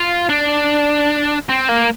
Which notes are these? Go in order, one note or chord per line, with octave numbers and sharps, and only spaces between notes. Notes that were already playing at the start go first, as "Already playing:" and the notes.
Already playing: F4
D4
C4
A#3